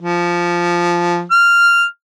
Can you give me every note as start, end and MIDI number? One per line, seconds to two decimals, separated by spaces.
0.01 1.23 53
1.31 1.84 89